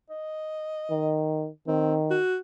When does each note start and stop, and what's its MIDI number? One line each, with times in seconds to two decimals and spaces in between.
0.10 1.21 75
0.90 1.48 51
1.67 2.19 51
1.67 1.95 60
2.10 2.37 66